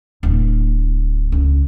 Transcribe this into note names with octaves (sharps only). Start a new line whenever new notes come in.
D1
C#2